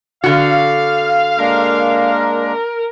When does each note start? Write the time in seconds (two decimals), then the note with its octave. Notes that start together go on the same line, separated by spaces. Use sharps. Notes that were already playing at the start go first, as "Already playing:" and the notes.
0.24 D3 F#4 F5
1.39 G#3 A#3 D4 A#4